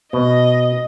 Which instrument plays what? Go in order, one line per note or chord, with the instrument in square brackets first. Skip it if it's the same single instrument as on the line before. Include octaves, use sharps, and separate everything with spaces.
[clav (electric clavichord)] B2 [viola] D#5